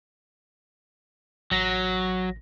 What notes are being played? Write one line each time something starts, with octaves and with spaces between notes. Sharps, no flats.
A1 F#3 A#6